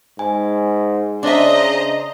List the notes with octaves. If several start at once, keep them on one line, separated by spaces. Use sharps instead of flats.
G#2 G#5
C#3 D4 C5 D#5 E5 A#5